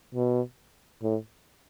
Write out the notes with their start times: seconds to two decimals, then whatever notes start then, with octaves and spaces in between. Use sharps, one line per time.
0.15 B2
1.03 A2